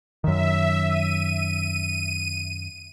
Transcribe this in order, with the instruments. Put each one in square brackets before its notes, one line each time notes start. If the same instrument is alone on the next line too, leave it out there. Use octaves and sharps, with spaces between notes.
[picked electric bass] F#2 D#3 [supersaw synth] E5
[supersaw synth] D#7